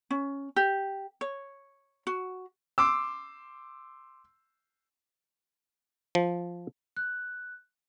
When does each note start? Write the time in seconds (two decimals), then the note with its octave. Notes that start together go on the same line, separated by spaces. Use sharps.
0.10 C#4
0.56 G4
1.21 C#5
2.07 F#4
2.78 C6 D6 E6
6.15 F3
6.96 F#6